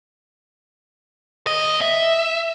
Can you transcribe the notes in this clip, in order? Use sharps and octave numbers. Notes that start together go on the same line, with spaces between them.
D#2 D#5
E5